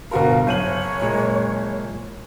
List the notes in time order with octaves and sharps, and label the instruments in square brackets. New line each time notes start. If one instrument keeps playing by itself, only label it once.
[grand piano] G1 C6 [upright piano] B2 F#4 A#4 [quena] F5
[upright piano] F#1 F#7 [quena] C#5 [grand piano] G6 D#7
[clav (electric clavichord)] A#2 G#3